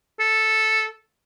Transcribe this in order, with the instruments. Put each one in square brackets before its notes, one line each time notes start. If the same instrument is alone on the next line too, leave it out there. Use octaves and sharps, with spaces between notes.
[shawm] A4